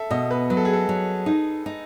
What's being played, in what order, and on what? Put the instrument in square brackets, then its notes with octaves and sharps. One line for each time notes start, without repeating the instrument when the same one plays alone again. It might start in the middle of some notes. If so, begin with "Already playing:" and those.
Already playing: [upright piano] A4 E5
[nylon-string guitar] B2 [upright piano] D#5
[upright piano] B4
[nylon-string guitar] F#3 [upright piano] B4
[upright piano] A4
G#4
A4
[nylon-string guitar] F#3
D#4
D#4